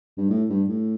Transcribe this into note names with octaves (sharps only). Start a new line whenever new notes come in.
G2
A2
G2
A2